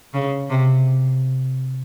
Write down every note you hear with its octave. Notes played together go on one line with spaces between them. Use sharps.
C#3
C3